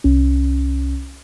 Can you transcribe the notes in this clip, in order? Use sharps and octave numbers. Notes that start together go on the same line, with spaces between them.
C2 C#4